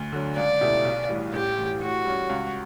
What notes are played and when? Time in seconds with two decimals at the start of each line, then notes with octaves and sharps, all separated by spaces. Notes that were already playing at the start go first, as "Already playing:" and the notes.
Already playing: D2
0.12 D3 F#3
0.36 C#2 D5
0.61 B2 A3 E4 G4
0.85 B1
1.09 A2 E3 G3
1.34 A1 G4
1.57 A2 E3
1.81 A2 F#4
2.05 G3 C#4
2.30 C#2